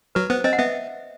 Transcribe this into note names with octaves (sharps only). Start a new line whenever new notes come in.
F#3 B4
B3 C5
C4 D#5
F#5
B3 E5